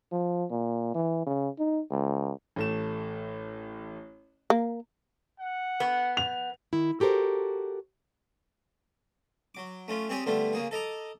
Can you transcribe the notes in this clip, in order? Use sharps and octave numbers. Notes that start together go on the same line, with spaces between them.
F3
A#2
E3
C#3
D#4
C#2
A1 A3 E7
A#3
F#5
B3
F7
D#3 E4
F#4 G4 A4 A#4 C5
F#3 D6
A3 C#4 F4
C4 G4 G#4 C#5 D5 G#5
D3 G3 A3 B3 F4
C#3 A#3 G#4
A4 D#5 A#5 D6